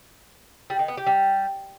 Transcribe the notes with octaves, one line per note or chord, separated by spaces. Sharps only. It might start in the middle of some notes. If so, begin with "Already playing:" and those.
G3
D#3
B3
G4
G3